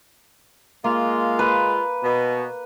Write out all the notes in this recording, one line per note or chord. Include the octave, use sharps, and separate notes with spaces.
G#3 A#3 F4
B4
B2